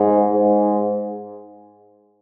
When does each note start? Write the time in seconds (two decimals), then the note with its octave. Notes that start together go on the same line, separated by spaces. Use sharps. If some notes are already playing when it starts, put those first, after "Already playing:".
Already playing: G#2
0.32 G#2